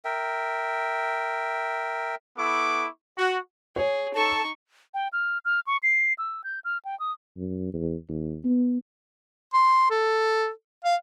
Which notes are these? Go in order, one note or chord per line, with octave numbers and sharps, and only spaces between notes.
A#4 E5 G5
B3 E4 A4 C#6 D6
F#4
G#4 C#5
D#4 A4 A5 C#6
G5
F6
F6
C#6
C7
E6
G6
F6
G5
D#6
F#2
E2
D#2
B3
C6
A4
F5